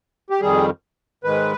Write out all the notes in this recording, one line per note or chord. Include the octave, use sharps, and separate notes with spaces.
G4
F2 D#3 G3 G#4
G#2 D#3 G#3 B4